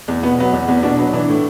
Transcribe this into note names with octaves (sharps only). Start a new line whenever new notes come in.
E2
B2 B3
F#3 B3
E2
E2
B2 D4
F#3 B3
E3 D4
A2